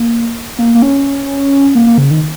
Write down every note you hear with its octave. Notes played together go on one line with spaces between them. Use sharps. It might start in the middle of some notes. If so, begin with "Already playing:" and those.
Already playing: A#3
A#3
A#3
C#4
A#3
A#3
C#3
D#3